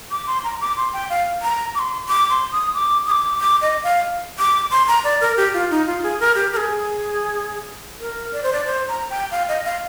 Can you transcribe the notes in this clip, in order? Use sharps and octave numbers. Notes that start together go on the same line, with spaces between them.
D6
C6
A#5
D6
C6
G5
F5
A#5
D6
C6
D6
C6
D#6
D6
D#6
D6
D6
D#5
F5
D6
C6
A#5
D5
A#4
G4
F4
D#4
F4
G#4
A#4
G4
A#4
G#4
A#4
D5
C5
D5
C5
A#5
G5
F5
D#5
F5